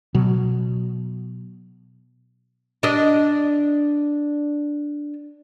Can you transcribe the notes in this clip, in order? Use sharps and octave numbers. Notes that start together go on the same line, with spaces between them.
B2 F#3
D4 D#5